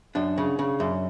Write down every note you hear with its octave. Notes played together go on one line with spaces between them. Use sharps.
F#2 D4
C#3
C#3
F#2